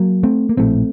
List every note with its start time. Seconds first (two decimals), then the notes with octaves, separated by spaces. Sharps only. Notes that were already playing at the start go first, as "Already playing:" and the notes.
Already playing: F#3 A#3
0.23 A3 C4
0.49 A#3
0.57 A#1 A2 A3 C4